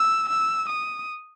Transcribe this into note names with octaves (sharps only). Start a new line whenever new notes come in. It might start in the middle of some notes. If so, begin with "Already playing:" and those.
Already playing: E6
E6
D#6